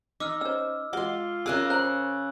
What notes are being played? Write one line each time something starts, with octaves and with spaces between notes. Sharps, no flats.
D#4 D6 E6 F6
C#4 C5 E6
G#3 F4 F#4 C6 D6 G7
C#3 G#4 A#4 E5 D6 E6 F#6
C5 A#5 F#6 F#7